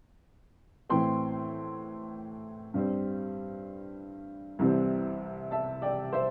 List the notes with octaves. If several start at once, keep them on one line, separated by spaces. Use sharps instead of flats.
A2 E3 C4 G5 C6
G2 G3 C4
C2 C3 E3 G3 C4
E5 A5
D5 G5
C5 E5